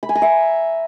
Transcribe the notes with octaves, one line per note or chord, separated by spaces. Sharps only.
B5
G#5
A#5
E5